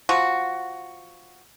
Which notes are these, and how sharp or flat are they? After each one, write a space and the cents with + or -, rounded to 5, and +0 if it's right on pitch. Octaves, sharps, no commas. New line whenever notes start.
F3 +0 F#4 +0